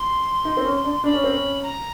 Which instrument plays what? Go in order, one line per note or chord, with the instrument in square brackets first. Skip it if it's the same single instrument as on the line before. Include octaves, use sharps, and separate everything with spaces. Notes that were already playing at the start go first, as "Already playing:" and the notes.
Already playing: [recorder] C6
[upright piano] D#4
C4
C#4
D4
[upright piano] D4 [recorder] B5
[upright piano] C#4
C4
C#4
[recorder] A#5